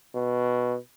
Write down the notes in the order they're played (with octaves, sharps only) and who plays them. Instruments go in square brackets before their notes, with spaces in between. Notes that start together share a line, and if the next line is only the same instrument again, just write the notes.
[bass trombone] B2